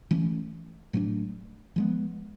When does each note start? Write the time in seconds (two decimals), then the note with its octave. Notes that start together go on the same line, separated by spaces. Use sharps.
0.11 E3 A3 C#4
0.93 A2 F#3 A3 D4
1.76 F3 G#3 B3